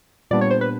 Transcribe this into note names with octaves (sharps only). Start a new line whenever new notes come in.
A#2 G3 B3 D4 D5
C#5
C5
B4